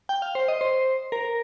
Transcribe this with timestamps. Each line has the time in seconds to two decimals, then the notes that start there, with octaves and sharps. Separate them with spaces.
0.09 G5
0.22 F5
0.35 C5
0.48 D#5
0.61 C5
1.12 A#4